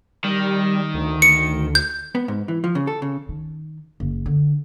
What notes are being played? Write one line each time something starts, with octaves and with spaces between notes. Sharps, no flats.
D#3 G3
D2
C#7
G6
B3
G#2
E3
F3
C#3
A4
C#3
D#3
F#1
D3